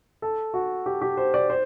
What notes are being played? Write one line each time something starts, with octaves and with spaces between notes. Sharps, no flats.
A4
F#4
G4
G4
C5
D5
C5